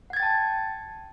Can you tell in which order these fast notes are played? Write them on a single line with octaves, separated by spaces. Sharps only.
F#5 G#6 A6 G5 A5